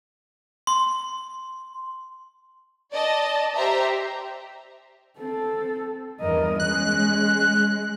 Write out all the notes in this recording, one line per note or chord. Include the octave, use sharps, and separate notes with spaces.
C6
D5 D#5 A5
G4 C5 E5 A#5
C4 A4
E2 G2 A#4 D#5
G#3 C#4 F#6